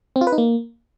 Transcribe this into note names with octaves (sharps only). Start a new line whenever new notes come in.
C4
F4
B4
D#4
A#3